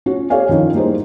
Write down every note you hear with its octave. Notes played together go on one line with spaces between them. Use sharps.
C#4 F4 F#4
G4 A4 C#5 D5 F5 G#5
D#3 F3 C#4 E4
G3 A#3 D#4 G#4 C5